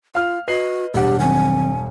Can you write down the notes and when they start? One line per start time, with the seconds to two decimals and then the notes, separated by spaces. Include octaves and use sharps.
0.15 F4 F5 F6
0.48 F#4 B4 D#5 C7 F#7
0.94 E1 G2 G4 F#5
1.20 D#3 F#3 C4 G#5